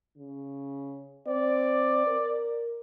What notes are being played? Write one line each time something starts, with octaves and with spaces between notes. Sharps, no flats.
C#3
C4 D5
A#4